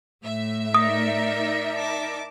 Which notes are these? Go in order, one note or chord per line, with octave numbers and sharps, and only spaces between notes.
A2 E5
D#4 A#4 D5 D#6
A5 D6